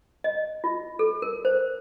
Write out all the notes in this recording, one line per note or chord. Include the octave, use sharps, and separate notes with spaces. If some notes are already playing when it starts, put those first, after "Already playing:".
D#5
F4
A4
A#4
C5